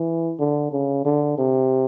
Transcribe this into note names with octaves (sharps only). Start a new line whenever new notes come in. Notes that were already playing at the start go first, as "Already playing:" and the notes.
Already playing: E3
D3
C#3
D3
C3